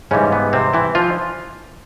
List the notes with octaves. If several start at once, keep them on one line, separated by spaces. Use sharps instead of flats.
G#2 C#3 E3 G3 C#4
B3
C3 C4
E3 E4
F3 F4